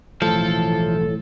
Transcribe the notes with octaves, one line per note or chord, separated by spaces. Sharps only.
B1 A2 E3 F3 A3 A4